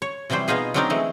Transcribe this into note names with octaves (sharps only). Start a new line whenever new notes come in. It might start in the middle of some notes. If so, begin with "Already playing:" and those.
C#5
C3 E3 F#3 G3 C5
B2 B3 D#4 F4 G#4
F#3 A#3 C4 D4 D#4 A#4
E3 G#3 A3